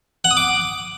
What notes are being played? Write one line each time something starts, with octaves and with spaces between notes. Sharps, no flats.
F#5
D#6
D6